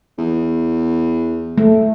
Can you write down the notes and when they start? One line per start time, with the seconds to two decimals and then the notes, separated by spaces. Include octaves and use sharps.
0.18 E2
1.58 A3